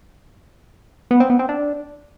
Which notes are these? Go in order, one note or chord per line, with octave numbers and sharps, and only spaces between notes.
B3
C4
B3
C4
D4